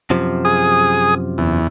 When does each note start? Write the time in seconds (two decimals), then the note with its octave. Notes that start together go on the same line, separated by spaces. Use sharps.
0.10 F#2 C3 F3
0.45 G#4 D#6
1.38 E2